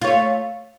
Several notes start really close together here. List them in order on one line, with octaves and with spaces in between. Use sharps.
F4 C#5 A3